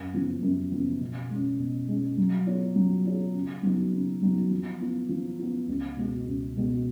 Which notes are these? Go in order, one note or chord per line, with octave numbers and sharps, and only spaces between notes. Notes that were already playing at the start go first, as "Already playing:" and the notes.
Already playing: F#2
C#3 F3 B3
F#2
C#3 F3 B3
B2
G#3 C#4
B2
G#3 C#4
F#3
B3 F4 G#4 C#5
F#3
B3 F4 G#4 C#5
C#3
F#3 B3 D#4 F#4
C#3
F#3 B3 D#4 F#4
F3
B3 F4
F3
B3 F4
C#2
B2 G#3 B3 F#4
C#2
B2 G#3 B3 F#4